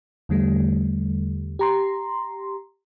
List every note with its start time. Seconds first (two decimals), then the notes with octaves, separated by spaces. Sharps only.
0.29 E2 D3 G3 A3
1.59 G4 A#5 C6